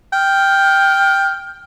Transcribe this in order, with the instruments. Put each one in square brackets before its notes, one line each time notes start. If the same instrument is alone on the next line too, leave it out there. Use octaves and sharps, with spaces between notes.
[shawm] G5 [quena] F6